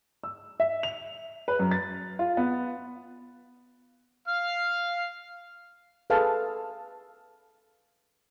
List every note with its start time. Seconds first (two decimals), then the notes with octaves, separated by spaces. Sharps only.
0.23 E6
0.60 E5
0.83 F7
1.48 B4
1.59 F#2
1.71 A6
2.19 F4
2.37 B3
4.28 F5 F6
6.10 G#4 A4 B4 F5 A5